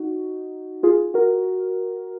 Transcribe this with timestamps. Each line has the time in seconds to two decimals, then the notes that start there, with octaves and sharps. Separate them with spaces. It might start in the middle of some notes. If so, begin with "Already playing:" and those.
Already playing: D#4 F#4
0.83 F4 G#4
1.14 F#4 A#4